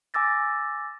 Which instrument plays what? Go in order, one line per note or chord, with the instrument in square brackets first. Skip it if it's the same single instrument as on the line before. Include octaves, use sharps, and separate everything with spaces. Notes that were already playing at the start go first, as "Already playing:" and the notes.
[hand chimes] G#5 D6 E6 A6 A#6